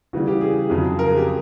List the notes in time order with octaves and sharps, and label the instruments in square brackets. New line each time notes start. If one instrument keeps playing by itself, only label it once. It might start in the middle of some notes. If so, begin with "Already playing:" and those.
[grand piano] C#3 E3 G3 F#4
G4
G#4
F2 C#3 F#3
A#4
G#4
G4